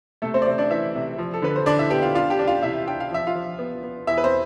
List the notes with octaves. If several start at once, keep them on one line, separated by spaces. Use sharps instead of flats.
C3 A3 A4
C4 C5
D5
C3 C4 C5
D4 D5
E3 E4 E5
C3
F3
A4
D3 B4
C5
D3 D4 D5
E4 E5
B3 G4 G5
F4 F5
D4 F4 F5
G4 G5
D4
F4 F5
C3 E4 E5
D4 G5
F5
F3 E5
F4 F5
F3
B3
B3
E2 E4 E5
B4
C4 C5